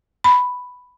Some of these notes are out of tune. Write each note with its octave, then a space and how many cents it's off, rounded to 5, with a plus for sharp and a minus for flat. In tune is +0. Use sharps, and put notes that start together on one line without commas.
B5 +5